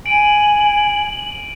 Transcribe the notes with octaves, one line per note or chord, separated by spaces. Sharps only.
G#5 D7 D#7 F#7